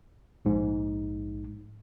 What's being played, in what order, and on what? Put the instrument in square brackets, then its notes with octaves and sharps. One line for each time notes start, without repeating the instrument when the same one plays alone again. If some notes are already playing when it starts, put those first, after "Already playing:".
[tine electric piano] A#1 G#2